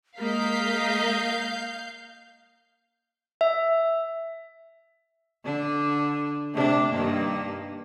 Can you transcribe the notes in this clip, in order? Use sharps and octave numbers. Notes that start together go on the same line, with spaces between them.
G#3 A#3 A#4 D#5 F5 G6 B6
E5
D3 D4
C3 A3 D4
G2 D#3 A#3